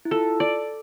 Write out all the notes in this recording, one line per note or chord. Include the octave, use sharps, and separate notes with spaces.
E4
F4 A4
D5